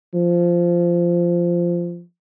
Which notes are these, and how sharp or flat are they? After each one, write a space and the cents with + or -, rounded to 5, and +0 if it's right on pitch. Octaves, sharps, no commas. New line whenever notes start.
F3 -10